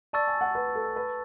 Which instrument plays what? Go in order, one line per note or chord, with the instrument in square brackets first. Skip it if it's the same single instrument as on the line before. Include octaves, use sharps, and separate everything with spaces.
[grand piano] D5 [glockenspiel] A5 C#6 E6 A6
[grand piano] G#5
F#5
B4
A4
B4